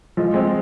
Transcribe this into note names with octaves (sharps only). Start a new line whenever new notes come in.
F3 G#3
G#3 C4